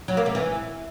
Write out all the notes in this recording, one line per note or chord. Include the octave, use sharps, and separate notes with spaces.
F#3
A#3
C3
E3